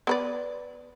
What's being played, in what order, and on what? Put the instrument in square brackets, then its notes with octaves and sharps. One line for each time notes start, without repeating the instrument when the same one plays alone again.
[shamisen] B3 B4 D5